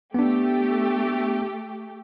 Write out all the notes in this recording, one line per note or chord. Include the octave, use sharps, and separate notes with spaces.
A3 B3 D4 G4